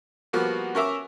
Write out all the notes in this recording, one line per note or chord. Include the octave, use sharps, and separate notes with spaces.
F3 G3 A#3 B3 F#4
C#4 A#4 E5 D6